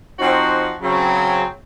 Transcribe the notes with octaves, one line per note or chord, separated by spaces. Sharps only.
F3 C4 D#4 F#4
C#3 F#3 C4